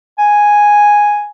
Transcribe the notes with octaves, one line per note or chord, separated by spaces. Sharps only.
G#5